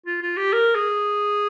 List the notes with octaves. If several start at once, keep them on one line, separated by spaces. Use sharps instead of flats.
F4
F4
G4
A#4
G#4